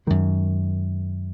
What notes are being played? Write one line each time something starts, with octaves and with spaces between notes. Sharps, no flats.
F#2 D#3 G#3